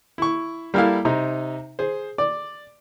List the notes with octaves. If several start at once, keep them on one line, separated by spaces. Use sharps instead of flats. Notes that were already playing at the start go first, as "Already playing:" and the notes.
E4 C#6
G3 A#3 E4 A4 F5
C3 D#4 A#5
G#4 C5
D5 D6